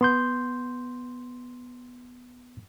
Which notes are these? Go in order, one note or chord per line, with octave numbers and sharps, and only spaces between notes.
B3 C6 G6